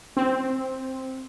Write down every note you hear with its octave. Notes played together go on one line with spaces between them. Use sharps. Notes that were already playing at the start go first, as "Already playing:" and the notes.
C4